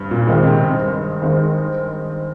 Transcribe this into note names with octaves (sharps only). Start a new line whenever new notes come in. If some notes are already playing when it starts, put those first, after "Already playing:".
Already playing: G2 C4
A#2
D#3 G#3 C4 D#4
C3
G2
D#3 G#3 C4 D#4